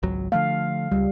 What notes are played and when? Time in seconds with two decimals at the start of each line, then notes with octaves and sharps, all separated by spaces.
0.03 G#1 C#2 F#3
0.32 D3 F3 A3 F5
0.91 C#2 G3